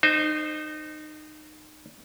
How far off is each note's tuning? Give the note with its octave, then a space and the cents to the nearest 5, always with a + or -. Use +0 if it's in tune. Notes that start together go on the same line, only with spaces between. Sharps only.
D#4 -25 C5 +0